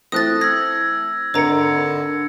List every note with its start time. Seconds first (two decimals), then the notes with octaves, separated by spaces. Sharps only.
0.12 E3 A3 C4 D#6 F#6 A6 A#6
0.41 E6 G#6 A#6
1.34 G#1 D3 A#4 C5 A#5 G#6 C#7 D7